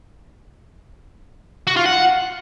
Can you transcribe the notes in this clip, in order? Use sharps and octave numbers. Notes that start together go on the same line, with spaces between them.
F#4
F4
F#5